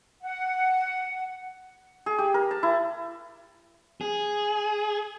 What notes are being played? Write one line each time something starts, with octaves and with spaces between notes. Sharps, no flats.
F#5
G#4
G4
A#4
A5
E4
G#4